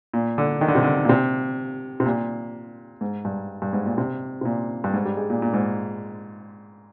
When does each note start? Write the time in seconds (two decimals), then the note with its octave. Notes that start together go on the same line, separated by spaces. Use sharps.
0.13 A#2
0.38 D3
0.61 D#3
0.68 D3
0.75 C3
0.83 D3
1.05 A#2
1.09 C3
2.00 C3
2.06 A#2
3.01 G#2
3.25 G2
3.62 G2
3.73 G#2
3.86 A#2
3.98 C3
4.41 C3
4.45 A#2
4.84 G2
4.93 G#2
5.05 G3
5.17 G#3
5.30 A#2
5.42 A#2
5.53 G#2